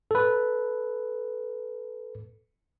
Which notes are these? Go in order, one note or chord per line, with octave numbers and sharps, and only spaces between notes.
A4 B4